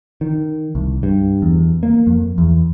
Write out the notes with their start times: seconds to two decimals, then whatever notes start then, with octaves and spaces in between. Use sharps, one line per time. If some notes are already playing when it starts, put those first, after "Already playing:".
0.21 D#3
0.75 C2
1.03 G2
1.42 E2
1.83 A#3
2.07 F2
2.38 E2